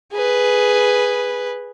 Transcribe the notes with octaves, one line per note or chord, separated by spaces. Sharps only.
G#4 B4